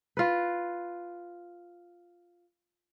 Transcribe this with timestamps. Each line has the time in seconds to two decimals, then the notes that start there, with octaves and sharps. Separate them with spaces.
0.17 F4 B4